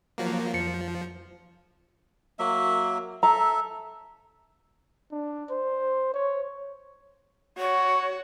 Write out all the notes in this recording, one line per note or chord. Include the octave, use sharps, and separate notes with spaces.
F3 F#3 A#3
F2 F3 C#7
F#3 A#3 E5
A4 E5 A#5
D4
C5
C#5
F#4 C#5